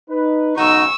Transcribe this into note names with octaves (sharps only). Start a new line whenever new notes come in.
D#4 B4
B1 G#2 C#3 D#4 F#4 C#6 E6